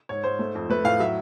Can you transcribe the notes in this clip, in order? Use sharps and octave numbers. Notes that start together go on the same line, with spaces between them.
G#2 C#5
G#2 C5
A3
F2
A3 B4
A2 F5
F#3 E5